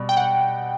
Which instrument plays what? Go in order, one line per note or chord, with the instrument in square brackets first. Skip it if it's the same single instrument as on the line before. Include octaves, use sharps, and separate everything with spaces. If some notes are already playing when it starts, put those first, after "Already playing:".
Already playing: [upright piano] B2 G3
[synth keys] G5
F#5